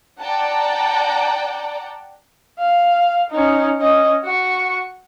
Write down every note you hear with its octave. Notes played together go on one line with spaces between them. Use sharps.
D5 F#5 G5 A5 A#5
F5
C#4 D#4
C#4 D#5
F#4 C#6